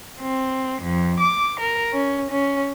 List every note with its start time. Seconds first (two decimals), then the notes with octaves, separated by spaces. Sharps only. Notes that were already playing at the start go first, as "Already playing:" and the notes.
0.20 C4
0.82 F2
1.19 D6
1.60 A#4
1.92 C#4
2.30 C#4